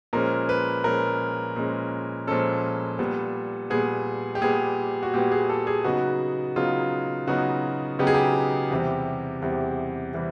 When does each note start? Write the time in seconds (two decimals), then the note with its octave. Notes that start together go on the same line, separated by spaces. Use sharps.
0.13 A#2 F3 G#3 C#4 A#4
0.49 B4
0.84 A#2 F3 G#3 C#4 A#4
1.56 A#2 F3 G#3 C#4
2.27 A#2 F3 G#3 C#4 A4
2.99 A#2 G3 B3
3.70 A#2 G3 B3 G#4
4.35 G4
4.42 A#2 G3 B3 G#4
5.03 F#4
5.14 A#2 G3 B3 G4
5.32 G#4
5.49 A4
5.67 G#4
5.84 C#3 F#3 B3 D#4 F#4
6.56 C#3 F#3 B3 D#4 F4
7.27 C#3 F#3 B3 D#4 F#4
7.99 C#3 F#3 B3 D#4 G4
8.07 G#4
8.14 G4
8.71 E2 C3 E3 G3
9.42 E2 C3 E3 G3
10.14 C3 E3 G3